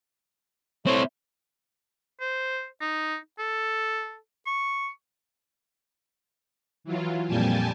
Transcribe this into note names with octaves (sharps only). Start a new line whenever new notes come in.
A3 C4 E4 C5 C#5
C5
D#4
A4
C#6
E3 F#3 F4
F2 A#2 G3 G4 G#5 A5